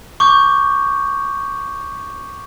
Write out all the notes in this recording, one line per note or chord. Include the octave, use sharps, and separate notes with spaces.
C#6 D6 G6